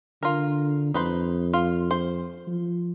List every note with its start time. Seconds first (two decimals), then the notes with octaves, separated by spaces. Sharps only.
0.23 D3 F4 A#4
0.94 F2 D#4 B4 C5
1.53 F4
1.91 C5
2.47 F3